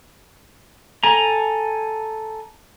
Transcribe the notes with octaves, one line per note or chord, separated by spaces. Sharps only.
A4 G#5 A#5